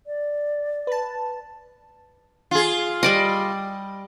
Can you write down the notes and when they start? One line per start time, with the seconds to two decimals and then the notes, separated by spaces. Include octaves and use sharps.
0.07 D5
0.87 B4 A5
2.51 F4 G#4
3.03 G3 D5 D#5